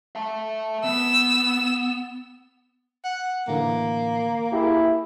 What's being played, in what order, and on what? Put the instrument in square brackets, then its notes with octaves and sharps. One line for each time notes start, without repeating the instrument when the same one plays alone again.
[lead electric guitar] E5 A5
[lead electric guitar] B3 [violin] E6
[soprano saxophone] F#5
[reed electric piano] A2 D3 E3 [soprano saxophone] A#3
[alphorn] E4 [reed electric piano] G4 G#4